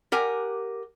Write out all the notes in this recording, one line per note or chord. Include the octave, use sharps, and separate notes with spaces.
G4 A#4 F#5 G#5